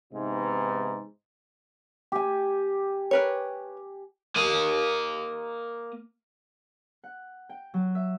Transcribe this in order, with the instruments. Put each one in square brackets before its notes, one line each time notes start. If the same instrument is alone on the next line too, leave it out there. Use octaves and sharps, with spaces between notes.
[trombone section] G#2 C3 E3 B3 D#4
[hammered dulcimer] G4 G#5
[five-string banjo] A#4 B4 C#5
[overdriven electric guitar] A#3 D#5
[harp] F#5
G5
F#3
E5